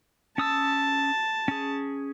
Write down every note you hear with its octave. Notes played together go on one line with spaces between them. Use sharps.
C#4 A5 D#6 E6
C#4 G#4